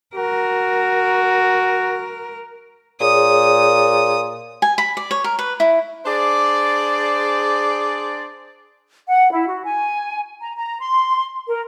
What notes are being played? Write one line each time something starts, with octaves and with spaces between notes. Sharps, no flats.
F#4 A#4
A#2 G#4 C#5 D#6
G#5
B5
D5
C#5
A#4
B4
E4
D4 G#4 C5 D5
F#5
E4
F#4
G#5
A#5
A#5
C6
A#4